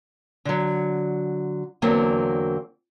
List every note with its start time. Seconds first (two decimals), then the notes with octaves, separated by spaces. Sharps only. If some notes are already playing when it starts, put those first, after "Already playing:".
0.45 D3 F#3
1.82 E2 D3 F#3 A#3 C4